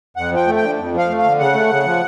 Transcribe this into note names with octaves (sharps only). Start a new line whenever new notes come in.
F2 F#5
F3 G5
A3
G5
D3
F2
F3 F5
A3
F5
D3
C#3 F#5
A3
C#3
F3